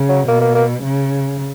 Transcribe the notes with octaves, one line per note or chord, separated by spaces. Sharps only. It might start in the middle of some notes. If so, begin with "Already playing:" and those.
Already playing: C#3
F#3
B2 A#3
A#3
A#3
C#3